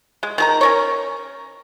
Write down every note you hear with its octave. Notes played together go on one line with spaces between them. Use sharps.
G#3
D#3 G#4 A#5
C#4 A#4 C#5